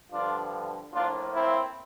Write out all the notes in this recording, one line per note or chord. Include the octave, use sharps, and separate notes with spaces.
G2 D3 F3 D4 F4
A2 F3 A#3 D4 F4
C4 E4